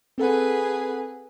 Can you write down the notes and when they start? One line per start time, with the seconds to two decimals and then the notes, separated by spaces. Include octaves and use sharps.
0.18 C4 G#4 A4 B4 F#5